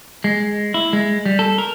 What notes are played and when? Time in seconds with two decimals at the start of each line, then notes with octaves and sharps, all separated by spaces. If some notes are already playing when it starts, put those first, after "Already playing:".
0.24 G#3
0.74 E4
0.93 G#3
1.26 G3
1.39 A4
1.58 A#4